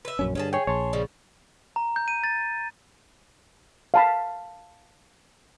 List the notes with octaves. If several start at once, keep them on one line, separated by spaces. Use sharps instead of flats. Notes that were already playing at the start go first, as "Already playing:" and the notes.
B4 E5
A#1 F#2 C#4
G2 D3 C#4 G#4 A5
G#4 C#5 G5
A#1 C#5 A5 C6
C#3 F3 G3
A#5
G6
D#7
A6
F5 A5 B5